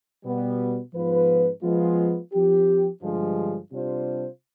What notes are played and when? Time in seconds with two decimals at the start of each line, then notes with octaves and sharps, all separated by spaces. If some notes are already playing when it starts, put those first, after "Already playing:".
0.24 B2 G3 B3
0.93 G#2 F3 B3 F4 B4
1.63 F3 G#3 B3 F4
2.32 F3 C4 G4
3.01 G2 D3 F3 G#3
3.71 C3 G3 D4 F4 C5